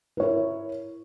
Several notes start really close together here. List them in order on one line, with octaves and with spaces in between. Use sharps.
A#4 C#5 E4